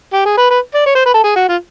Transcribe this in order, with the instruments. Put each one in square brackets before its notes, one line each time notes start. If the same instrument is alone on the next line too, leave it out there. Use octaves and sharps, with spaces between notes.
[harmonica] G4
G#4
B4
B4
D5
C#5
C5
B4
A4
G#4
F#4
F4